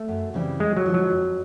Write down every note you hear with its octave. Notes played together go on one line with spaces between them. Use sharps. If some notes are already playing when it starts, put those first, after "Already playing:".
Already playing: A3
F#2
C#3 E3 G3 C4
F2 G#3
F#3
D3 F3 G#3
F#3
F2